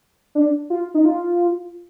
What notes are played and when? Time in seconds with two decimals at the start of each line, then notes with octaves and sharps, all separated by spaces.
0.35 D4
0.70 F4
0.94 D#4
1.05 F4